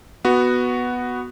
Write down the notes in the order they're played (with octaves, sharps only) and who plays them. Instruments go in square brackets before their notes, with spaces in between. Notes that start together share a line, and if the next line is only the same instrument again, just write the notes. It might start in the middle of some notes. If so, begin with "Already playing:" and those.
[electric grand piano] B3 F#4